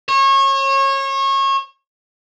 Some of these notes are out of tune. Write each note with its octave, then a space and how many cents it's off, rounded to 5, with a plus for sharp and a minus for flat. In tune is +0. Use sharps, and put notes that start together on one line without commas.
C#5 -30